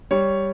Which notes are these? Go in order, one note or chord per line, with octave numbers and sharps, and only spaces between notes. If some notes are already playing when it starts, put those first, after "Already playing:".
G3 C#5